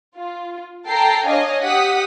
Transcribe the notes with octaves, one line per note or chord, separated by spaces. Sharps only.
F4
A4 G5 A5 A#5 C7
D4 C#5 D#5 F5 G#5
G4 F#5 D#6 B6